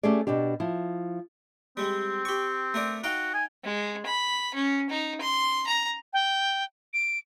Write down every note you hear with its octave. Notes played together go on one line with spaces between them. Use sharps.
A3 C#4 G4 G#4 D5
B2 B3 D4 G4
F3 E4
G3 G#3 C4
G4 C#6
A3 A#4 D5
D#4 F#4 F5 G5
G#5
G#3
B5
C#4
D#4
C6
A#5
G5
D7